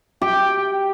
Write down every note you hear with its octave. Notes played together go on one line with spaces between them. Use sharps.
G4 G5